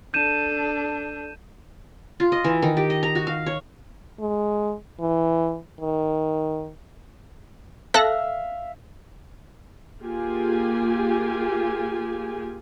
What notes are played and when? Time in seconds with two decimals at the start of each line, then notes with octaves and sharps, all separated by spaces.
0.14 D4 A4 G6 D#7 E7
2.20 F4
2.32 D#5
2.44 E3
2.62 D#3
2.77 G4
2.90 D#5
3.03 A#5
3.15 F#4
3.27 F5
3.46 C#5
4.20 G#3
5.00 E3
5.81 D#3
7.94 A4 E5 F5 F#6 A#6
10.02 A#3 F4 G4 G#4 G#5